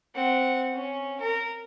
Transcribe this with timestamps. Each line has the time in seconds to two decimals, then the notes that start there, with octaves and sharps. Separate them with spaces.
0.15 C4 F#5
0.73 C#4
1.20 A#4